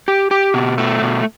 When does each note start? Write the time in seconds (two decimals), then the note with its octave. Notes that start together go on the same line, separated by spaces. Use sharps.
0.08 G4
0.31 G4
0.54 B2
0.78 A3
1.02 B2